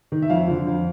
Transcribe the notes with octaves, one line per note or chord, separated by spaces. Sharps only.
D#3
E5
F2 F5
D3 F3
F2